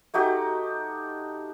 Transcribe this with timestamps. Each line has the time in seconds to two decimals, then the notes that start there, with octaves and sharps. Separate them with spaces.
0.14 A3 D#4 F#4 G4